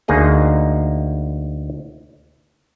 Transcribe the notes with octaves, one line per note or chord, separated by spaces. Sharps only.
D2 A#3 D#4 G#4 D#5